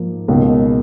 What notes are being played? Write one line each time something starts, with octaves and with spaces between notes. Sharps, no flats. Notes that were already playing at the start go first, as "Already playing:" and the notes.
Already playing: G#2 F3 A#3 D#4
C#2 B2 A#3